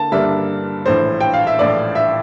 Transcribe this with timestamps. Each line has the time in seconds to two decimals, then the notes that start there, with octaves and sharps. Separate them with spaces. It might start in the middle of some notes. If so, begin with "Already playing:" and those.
Already playing: D3 A#3 A5
0.12 G2 D3 G3 A#3 D4 E5
0.86 A#1 A2 E3 C5
1.20 G5
1.34 F5
1.47 E5
1.59 A#1 A2 E3 D5
1.95 E5